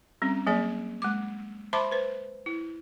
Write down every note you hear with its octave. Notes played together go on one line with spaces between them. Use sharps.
G3 C4 C#4
F#3 A#3 G#4 D5
G#3 D6
C5 E5 A5 B5 C6 D6
B4 C5
E4